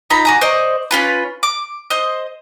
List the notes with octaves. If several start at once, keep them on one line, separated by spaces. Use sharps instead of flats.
D#4 F4 A#5 B5
F#4 G#5 A#5
C5 D5 D#5 C#6
C#4 F4 B4
D6
C5 D#5